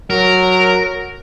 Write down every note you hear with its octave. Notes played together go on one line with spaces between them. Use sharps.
F#3 A#4